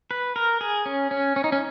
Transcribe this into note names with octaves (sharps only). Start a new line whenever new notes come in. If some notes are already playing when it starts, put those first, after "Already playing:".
B4
A#4
G#4
C#4
C#4
C#4
D#4
C#4